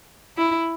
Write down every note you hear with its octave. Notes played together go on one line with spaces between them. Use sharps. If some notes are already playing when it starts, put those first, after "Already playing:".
E4